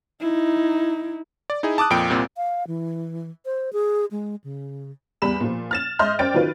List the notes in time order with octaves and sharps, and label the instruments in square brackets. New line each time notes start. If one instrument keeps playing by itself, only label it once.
[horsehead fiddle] D#4 E4
[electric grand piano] D5
D#4 E4 G#4
A5 D6 D#6 F#6
F2 A#2 G5 D7
C2 A#2 C4
[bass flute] F5
E3
C5
G#4
G#3
C#3
[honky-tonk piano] E2 G3 B5 E7
A#2 F3
F6 A6 E7
G#2 D#5 E5 C6 F6 G6
F#2 C5 D5 G5 A6 D7
D#3 F#3 F4 B4